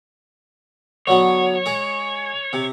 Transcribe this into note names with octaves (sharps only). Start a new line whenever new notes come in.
D3 F#3 B3 C#5
G#3 G#4
C3